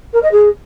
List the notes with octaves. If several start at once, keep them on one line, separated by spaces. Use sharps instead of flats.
A#4
D#5
G#4